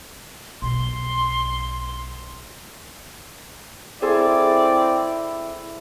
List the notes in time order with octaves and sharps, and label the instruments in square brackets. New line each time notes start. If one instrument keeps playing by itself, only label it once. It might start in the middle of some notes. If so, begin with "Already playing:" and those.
[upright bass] B1 [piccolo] C6
[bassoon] C4 [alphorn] E4 [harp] G#4 A4 C6 [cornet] D5